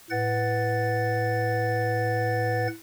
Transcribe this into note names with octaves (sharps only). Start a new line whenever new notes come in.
A2 B4 F#5 A6